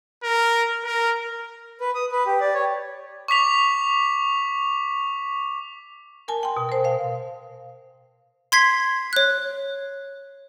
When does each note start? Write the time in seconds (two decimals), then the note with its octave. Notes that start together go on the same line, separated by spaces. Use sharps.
0.23 A#4
0.85 A#4
1.80 B4
1.95 D#6
2.12 B4
2.26 G4
2.41 D5
2.54 C#5
3.28 C#6 D6 B6 F7
6.28 A#4 G#5 A5
6.43 G5 C6
6.57 B2
6.69 A#4 C5
6.84 C5 F5
8.52 C6 G#6 B6 C7
9.13 C#5 F#6